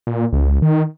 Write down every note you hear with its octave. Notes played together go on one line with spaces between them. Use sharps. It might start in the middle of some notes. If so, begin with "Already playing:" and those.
A#2
C#2
D#3